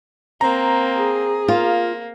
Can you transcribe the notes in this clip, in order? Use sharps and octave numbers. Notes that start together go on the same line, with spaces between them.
A#3 C4 A#5
G#4
A#3 F4